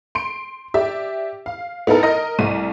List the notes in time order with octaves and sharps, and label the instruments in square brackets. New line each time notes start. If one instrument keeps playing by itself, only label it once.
[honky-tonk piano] C6 D7
G4 D5 E5
F5
B3 D#4 E4 A4 A#4
A#4 D#5 A#6
C2 A3 D#7